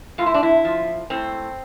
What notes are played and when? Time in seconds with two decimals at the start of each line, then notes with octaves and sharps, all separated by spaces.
0.18 A2 F4
0.26 E4
0.34 D4
0.43 E4
0.65 F3
1.10 A2 C4